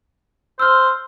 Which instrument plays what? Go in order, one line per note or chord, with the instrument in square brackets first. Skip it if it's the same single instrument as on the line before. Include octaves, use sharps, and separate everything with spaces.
[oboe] C5 [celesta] E6 F6